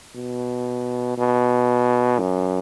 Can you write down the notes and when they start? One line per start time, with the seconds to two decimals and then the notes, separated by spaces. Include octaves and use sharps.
0.15 B2
1.18 B2
2.19 F#2